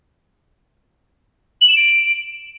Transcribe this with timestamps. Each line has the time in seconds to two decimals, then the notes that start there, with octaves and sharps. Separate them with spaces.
1.61 F#7
1.68 E7
1.76 D7